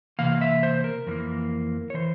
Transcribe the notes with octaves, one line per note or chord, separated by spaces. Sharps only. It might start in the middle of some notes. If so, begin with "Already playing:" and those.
C3 E3 A#3 F5
E5
C5
A#4
F2 E3 A#3
C#5
E3 C5